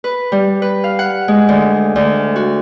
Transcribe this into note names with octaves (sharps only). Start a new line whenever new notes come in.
B4
G3
B4
F5
F#5
G#3
D2
D2
F#4